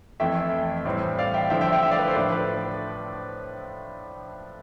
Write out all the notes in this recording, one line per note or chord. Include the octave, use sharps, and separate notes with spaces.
F2 E3 A3 E5 G5
A2 E3 G3 C4
D5 F5
E5 G5
D3 F3 A3 E4 E5 G5
E5 G5
E5 G5
E5 G5
D5 F5
B4
A4 C5
A2 F3 A3 D4 B4 D5
B4